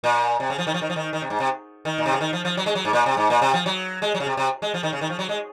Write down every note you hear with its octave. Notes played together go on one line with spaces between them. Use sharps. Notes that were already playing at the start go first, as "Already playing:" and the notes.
A#2
C3
C#3
F3
D#3
F3
D#3
F3
D#3
D#3
C3
G#2
C3
D#3
A#2
C3
C#3
D#3
F3
F3
F#3
G#3
F#3
G#2
A#2
C3
G#2
A#2
C3
F3
F#3
G#3
F#3
C#3
C3
C3
G#3
F3
D#3
C#3
D#3
F3
F#3
G#3